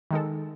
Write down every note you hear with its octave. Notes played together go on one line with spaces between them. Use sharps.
D#3 G#3 D#4 A4